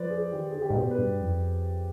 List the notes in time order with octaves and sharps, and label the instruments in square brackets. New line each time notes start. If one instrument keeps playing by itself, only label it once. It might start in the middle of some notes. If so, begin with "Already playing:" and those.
Already playing: [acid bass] F3 [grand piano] B4 C5 D5
[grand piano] G#4
[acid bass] D#3 [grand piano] G4
[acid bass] D3 [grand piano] G#4
[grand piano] G4
[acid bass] G#2
B2
[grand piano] B4
[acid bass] G2
F2